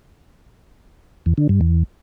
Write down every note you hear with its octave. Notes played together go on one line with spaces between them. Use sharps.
E2
D3
G2
E2